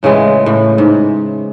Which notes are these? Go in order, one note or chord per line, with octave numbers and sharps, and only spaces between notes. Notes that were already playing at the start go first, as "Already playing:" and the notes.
A2 C#3 E3 G#3
A2
G#2